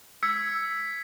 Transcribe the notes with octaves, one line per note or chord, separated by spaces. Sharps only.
E6 G#6 B6 C#7